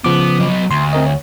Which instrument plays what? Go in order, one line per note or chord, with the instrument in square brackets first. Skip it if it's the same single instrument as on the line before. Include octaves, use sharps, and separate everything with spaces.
[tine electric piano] C#3 F3 D6 [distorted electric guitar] B3
[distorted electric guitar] F#3 D#5
[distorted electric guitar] D2 [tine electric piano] C6
[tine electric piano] C4 A#4 D#5
C#5